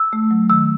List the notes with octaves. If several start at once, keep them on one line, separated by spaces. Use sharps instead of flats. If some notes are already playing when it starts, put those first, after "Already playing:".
Already playing: E6
A3
F#3
D#3 E6